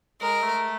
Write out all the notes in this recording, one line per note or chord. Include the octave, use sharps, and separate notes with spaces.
G#3 A#4
A3